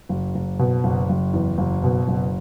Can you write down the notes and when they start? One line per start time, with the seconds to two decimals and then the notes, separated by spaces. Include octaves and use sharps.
0.09 F#1
0.35 F#1
0.59 B2
0.84 F#1
1.09 F#1
1.34 E2
1.58 F#1
1.84 B2
2.08 F#1